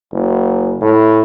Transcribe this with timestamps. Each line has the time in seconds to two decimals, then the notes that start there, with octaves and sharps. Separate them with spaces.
0.12 F#1
0.82 A2